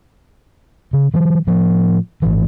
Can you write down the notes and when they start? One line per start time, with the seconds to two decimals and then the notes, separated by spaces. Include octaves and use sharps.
0.93 C#3
1.14 E3 F#3
1.47 A2 F3
2.22 G#1 C#2 E3